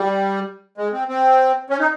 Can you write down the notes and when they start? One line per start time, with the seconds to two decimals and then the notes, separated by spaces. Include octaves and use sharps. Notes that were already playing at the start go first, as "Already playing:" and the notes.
Already playing: G3
0.78 G#3
0.93 C4
1.09 C4
1.70 C#4
1.80 D#4